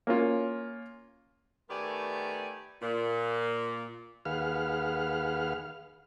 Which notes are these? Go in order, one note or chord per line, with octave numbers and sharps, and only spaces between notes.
A#3 C#4 F4
D#3 A3 B3 G4 D5 G#5
A#2
D#2 G#4 B4 F5 F#5 F6